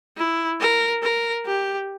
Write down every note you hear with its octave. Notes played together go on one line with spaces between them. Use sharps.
E4
A#4
A#4
G4